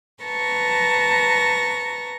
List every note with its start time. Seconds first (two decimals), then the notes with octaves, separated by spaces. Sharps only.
0.22 B4 A5 A#5 C#6 A#6